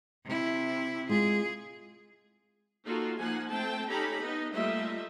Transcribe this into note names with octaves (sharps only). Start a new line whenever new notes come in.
C3 E4
G#3 F4 G#4
A#3 D#4 F4 F#4 A4
F3 A#3 D#4 F#5 G#5
A3 C4 G5 A5
C#4 D#4 G4 A4 A#5 B5
B3 D#4 D#5
G3 A3 A#3 F4 D#5 E5